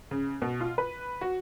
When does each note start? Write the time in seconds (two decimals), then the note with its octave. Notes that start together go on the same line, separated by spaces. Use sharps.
0.11 C#3
0.42 B2
0.61 F4
0.78 B4
1.21 F#4